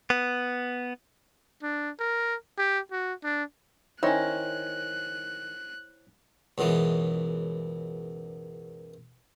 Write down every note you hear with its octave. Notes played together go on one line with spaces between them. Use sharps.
B3
D4
A#4
G4
F#4
D4
D#3 C#4 E4 C5 C#5 F#6
C#2 F#2 B2 E3 G#3